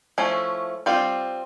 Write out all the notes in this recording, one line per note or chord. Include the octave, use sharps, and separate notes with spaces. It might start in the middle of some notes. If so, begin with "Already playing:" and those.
F3 A3 C#4 E4
G3 C4 F4